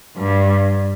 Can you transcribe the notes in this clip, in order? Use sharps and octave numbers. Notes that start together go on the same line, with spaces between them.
G2